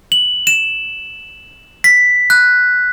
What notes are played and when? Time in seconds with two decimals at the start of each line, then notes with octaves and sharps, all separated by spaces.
0.12 F#7
0.47 E7
1.84 B6
2.30 F#6